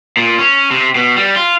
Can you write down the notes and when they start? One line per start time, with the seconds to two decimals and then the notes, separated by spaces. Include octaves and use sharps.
0.17 A#2
0.39 C#4
0.71 C3
0.95 B2
1.16 G3
1.36 F4